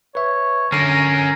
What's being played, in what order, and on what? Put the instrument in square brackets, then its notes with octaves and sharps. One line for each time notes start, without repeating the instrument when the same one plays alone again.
[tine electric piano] B4 E5 [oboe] C#5
[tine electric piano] D3 [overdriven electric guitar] C#4 A#4 [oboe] A#5 [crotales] A#6 C7